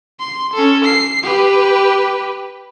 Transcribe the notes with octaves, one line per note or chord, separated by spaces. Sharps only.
C6
C#4 A4
C7
G4 B4